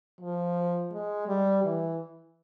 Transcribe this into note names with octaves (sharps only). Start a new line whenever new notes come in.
F3
G#3
G3
E3